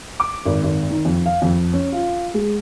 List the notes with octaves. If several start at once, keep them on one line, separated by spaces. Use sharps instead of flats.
D6
G#1
G#1
D#3
F2
F5
F2
C#4
F4
G#3